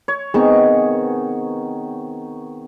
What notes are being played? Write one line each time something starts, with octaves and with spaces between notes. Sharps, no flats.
C#5
D#3 B3 C4 G#4 C#6